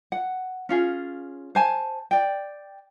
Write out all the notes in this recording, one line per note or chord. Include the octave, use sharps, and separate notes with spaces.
F#5
C#4 F4 G#4
C5 G#5 A5
D5 G5